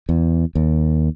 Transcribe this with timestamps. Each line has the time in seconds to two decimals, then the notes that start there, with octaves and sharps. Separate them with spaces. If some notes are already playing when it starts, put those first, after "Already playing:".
0.09 E2
0.55 D#2